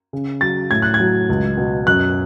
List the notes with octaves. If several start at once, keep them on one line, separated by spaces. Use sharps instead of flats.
C#3
F#3 A6
A2 G#6
F#6
G#6
F#3
C#2
B2
F#2 F#6